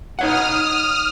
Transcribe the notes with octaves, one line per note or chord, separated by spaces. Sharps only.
D#4 C#5 F#5 D#6 F6